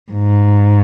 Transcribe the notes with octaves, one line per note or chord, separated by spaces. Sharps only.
G#2